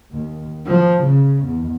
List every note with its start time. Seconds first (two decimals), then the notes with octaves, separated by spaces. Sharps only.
0.11 D#2
0.66 F3
1.02 C#3
1.44 E2